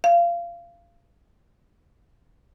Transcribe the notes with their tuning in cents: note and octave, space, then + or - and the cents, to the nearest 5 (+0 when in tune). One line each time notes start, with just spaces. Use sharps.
F5 -25